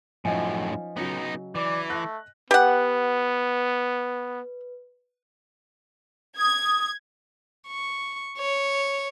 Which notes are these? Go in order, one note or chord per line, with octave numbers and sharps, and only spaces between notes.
F#2 A2 F3 C#4 D#4 D#5 G#5
C#3 F#3 B3 D#4
E3 D5
A3 F#6 A#6
B3 G4 B4 F#5
D#6 G#6
C#6
C#5